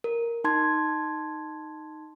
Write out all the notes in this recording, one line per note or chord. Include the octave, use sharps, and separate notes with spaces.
A#4
D#4 A5 C6 G#6